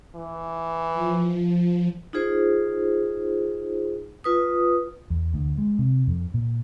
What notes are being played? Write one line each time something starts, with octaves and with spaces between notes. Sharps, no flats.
E3
F3
D#4 F4 G#4 C5
F4 B4 D#6
E2
D2
G#3
C3
F2
A#2